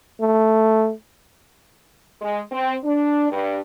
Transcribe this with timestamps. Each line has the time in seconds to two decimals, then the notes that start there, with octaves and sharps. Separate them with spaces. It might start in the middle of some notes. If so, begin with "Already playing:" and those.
0.21 A3
2.22 G#3
2.51 C4
2.84 D4
3.30 G2